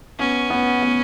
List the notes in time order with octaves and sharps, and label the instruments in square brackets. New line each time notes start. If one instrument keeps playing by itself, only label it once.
[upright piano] B3 [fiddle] C#4
[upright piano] B3
B3